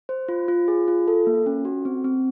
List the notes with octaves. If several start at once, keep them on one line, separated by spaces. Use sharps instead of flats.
C5
F4
F4
G#4
F4
A4
A#3
C#4
F#4
C4
C4